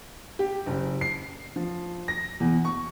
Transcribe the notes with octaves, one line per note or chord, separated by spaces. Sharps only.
G4
F#1
C7
F3
A#6
E2
C#6